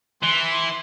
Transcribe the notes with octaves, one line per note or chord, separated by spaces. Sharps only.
E3 C6